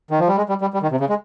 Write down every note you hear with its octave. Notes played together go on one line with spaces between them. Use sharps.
D#3
F3
G3
G#3
G3
G3
G3
D#3
C3
C#3
G#3